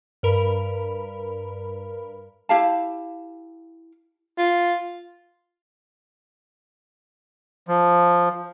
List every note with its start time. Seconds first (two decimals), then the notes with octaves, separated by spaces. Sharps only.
0.23 G2 A#4 B5
2.49 E4 G4 F5 A5
4.38 F4
7.68 F3